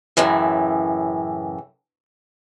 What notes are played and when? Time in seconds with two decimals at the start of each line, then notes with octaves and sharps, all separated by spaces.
0.17 F#2 A2 C#3 E3